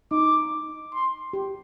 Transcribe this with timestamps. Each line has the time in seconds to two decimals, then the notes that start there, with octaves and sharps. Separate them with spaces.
0.11 D#4 D6
0.94 C6
1.33 G4